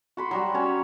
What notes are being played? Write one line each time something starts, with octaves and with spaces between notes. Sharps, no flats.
F#4 B5 C6
F#3 G3 F#4
C#4 C#5